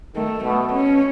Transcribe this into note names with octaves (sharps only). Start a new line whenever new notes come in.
D#3 A3
B2 A3
C#4